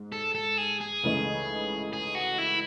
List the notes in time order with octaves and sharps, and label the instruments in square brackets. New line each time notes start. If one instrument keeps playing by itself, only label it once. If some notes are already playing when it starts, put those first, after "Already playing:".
Already playing: [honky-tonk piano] G#2
[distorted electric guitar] A4
A4
G#4
G#4
[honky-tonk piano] C#2 C#3 E3 A3 D#4
[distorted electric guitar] G#4
F#4
E4